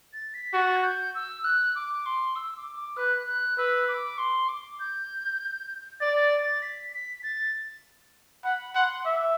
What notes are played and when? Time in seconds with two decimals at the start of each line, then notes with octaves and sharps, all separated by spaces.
0.13 A6
0.34 B6
0.53 F#4 A6
0.76 F#6
0.84 G6
1.15 E6
1.44 F#6
1.75 D6
2.06 C6
2.36 E6
2.57 D6
2.76 D6
2.97 B4 F#6
3.27 F#6
3.58 B4 E6
3.88 D6
4.18 C6
4.48 D6
4.80 G6
6.00 D5 A6
6.21 A6
6.42 A6
6.62 B6
6.92 B6
7.23 A6
8.44 F#5 B5
8.75 F#5 C6
9.05 E5 D6